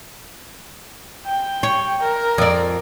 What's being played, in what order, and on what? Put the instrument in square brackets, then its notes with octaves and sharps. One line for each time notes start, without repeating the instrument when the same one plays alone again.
[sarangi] G5
[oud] C#5
[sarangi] A#4
[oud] F2 D5